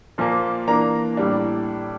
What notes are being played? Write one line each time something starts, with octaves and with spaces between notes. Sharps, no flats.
A#2 F3 A#3
E3 A#3 D4 A#5
A2 G3 D4